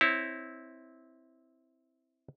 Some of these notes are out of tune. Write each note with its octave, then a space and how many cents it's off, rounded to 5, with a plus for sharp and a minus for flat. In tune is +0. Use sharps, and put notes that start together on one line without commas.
C4 +0 E4 -15 C#5 +0